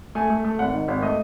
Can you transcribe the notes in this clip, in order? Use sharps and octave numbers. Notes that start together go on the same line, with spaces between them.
A3 G#5
A3
A3
G#1 F#5
D#3
G#1
A3 D#5